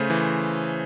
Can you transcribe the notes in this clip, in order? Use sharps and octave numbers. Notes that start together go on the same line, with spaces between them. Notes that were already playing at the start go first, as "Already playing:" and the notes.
Already playing: C#3 A3 C5
E3